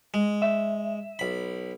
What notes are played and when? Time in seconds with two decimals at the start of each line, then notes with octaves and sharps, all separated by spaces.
0.14 G#3
0.42 E5
1.19 B1 B5